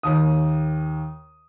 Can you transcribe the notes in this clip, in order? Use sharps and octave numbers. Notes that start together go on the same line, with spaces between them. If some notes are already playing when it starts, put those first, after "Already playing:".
D#2 D#6